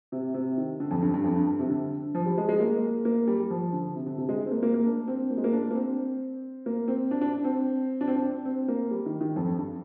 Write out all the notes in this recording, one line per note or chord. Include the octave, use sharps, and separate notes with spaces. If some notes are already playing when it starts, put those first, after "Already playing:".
C3
C3
D#3
D3
F2
G2
G2
F2
G2
G2
C3
D3
F3
G3
G#3
G#3
A#3
A#3
G3
G3
F3
D3
C3
D3
C3
G#3
C4
A#3
A#3
A#3
D4
C4
A#3
G#3
A#3
D4
A#3
C4
A#3
C4
D4
D4
D4
C4
D4
C4
D4
C4
A#3
G3
D#3
D#3
F2
G2
G2